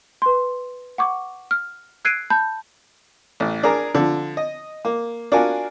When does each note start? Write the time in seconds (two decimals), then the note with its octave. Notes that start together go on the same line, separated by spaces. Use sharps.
0.22 B4 C6
0.98 F#5 C#6 D6
1.51 F6
2.05 E6 F#6 G#6 C7 D7 D#7
2.30 A5 B5 G6
3.40 A1
3.63 D4 G#4 A#4 A#5
3.95 D3 F3
4.37 D#5
4.85 A#3
5.32 D4 F4 F#4 A#4 G#5